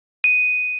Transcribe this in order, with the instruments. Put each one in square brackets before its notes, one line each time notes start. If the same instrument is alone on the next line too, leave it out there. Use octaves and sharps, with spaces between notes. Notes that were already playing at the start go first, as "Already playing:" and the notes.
[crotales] D#7